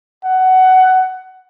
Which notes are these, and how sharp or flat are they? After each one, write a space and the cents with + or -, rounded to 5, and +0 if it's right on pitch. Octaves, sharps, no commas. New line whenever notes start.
F#5 +15